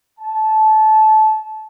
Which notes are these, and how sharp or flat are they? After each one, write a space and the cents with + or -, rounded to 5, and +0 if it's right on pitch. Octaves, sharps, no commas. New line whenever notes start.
A5 -20